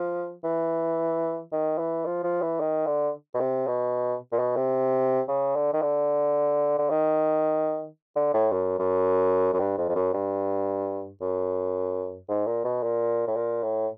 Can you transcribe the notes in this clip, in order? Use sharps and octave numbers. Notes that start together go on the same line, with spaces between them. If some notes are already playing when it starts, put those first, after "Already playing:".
Already playing: F3
E3
D#3
E3
F3
F3
E3
D#3
D3
B2
C3
B2
A#2
B2
C3
C#3
D3
D#3
D3
D3
D#3
D3
A2
F#2
F#2
F#2
G2
F2
F2
F#2
G2
F#2
G#2
A#2
B2
A#2
A2
A#2
A2